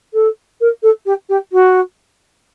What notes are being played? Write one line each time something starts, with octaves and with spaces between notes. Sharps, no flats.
A4
A#4
A4
G4
G4
F#4